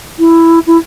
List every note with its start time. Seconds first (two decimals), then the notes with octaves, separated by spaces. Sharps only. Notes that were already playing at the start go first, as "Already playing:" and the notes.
0.19 E4
0.67 E4